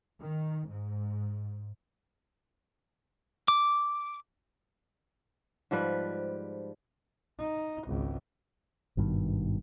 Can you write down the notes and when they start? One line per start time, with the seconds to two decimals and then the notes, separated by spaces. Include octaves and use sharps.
0.20 D#3
0.69 G#2
3.48 D6
5.71 G#2 F3 G3 B4
7.39 D#4
7.86 G#1 C#2
8.97 G#1 G2 B2 D#3